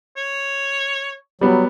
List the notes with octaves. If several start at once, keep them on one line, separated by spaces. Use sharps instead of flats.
C#5
F#3 G3 B3